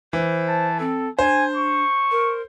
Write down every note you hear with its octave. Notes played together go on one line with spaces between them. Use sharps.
E3 C5
A5
C4 A4
D4 C5 G#5
C#6
A#4